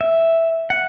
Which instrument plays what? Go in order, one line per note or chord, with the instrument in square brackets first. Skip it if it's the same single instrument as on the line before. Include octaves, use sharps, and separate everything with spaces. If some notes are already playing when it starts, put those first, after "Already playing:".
[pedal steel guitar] E5
F#5